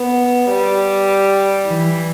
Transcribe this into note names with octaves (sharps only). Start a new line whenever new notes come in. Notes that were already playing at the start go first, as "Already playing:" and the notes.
Already playing: B3
G3
E3